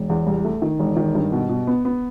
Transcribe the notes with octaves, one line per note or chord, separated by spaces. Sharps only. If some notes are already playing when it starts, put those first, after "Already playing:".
Already playing: E1
E2
C2
A3
D#3
E1
D#3
G2
B2
B2
B3
B3